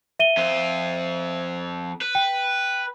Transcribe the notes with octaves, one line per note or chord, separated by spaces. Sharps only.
E5 D#7 G7
F2 C4
B4
G5